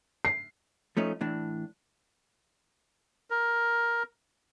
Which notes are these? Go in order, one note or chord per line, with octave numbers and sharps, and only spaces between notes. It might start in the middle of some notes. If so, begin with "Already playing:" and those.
C7
F3 A3 C#4 D#4
A2 E3 D4
A#4